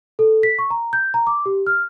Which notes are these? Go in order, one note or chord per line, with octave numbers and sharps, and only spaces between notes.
A4
B6
C#6
A#5
G6
A#5
D6
G4
F6